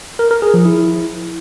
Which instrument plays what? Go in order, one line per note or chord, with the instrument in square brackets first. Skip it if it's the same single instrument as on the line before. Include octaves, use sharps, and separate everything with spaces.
[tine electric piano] A#4
A#4
G#4
F3
E4